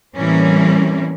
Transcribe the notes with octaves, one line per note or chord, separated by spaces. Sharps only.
A2 E3 G3 A#3 C4 C#4